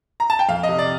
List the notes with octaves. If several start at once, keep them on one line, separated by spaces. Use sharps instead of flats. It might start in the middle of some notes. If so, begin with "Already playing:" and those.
A#5
A5
G5
F2 F5
D#5
C3
D5